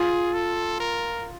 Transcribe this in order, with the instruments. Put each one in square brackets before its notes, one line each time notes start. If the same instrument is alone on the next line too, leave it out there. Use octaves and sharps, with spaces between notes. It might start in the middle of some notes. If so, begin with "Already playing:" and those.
Already playing: [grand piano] F4 [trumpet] G#4
[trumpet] A4
A#4